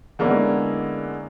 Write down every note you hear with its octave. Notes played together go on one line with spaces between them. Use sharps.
D3 G#3 A#3 B3 C#4 E4